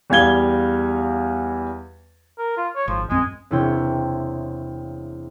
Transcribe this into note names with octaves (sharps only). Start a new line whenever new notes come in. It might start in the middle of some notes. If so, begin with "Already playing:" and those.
E2 G3 F5 G#6 G7
A#4
F4
C#5
G#1 F3
A#1 F#2 G#3 C4
E1 C3 E4 C#5 G5